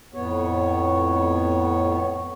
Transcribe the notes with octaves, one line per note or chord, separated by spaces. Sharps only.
F2 A2 B3 C#5